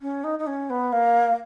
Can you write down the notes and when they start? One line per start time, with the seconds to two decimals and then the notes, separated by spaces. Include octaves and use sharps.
0.02 C#4
0.24 D#4
0.39 D#4
0.47 C#4
0.70 B3
0.93 A#3